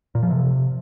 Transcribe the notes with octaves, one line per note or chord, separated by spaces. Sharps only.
A#2
F3
C3